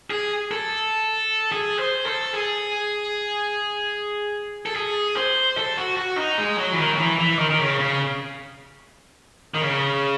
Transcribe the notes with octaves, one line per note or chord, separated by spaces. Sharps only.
G#4
A4
G#4
C5
A4
G#4
A4
G#4
C5
A4
F#4
F#4
D#4
G#3
F#3
E3
D#3
F#3
E3
E3
D#3
D#3
C#3
C#3
D#3
C#3